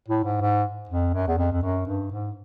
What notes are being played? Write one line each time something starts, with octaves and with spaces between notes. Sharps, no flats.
A2
G#2
G#2
F2
F#2
E2
F2
F2
F#2
G2
G#2